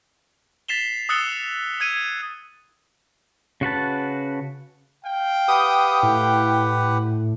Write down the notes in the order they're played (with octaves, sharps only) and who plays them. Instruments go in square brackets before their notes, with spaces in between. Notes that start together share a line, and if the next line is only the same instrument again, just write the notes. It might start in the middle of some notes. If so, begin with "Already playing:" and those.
[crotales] A6 B6 C7 E7 F7 G7
D#6 E6 F#6 A6 C#7 G7
E6 G#6 C#7 D#7
[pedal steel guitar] C#3 F#4 B4 A5
[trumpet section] F5 G5
[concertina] G4 B4 F#5 [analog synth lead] D#6
[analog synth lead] A2